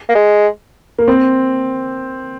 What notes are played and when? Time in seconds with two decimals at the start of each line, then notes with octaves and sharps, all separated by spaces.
0.09 A#3
0.15 G#3
0.98 A#3
1.08 C4